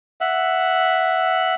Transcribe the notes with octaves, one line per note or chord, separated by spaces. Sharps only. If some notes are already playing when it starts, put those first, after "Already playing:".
E5 F#5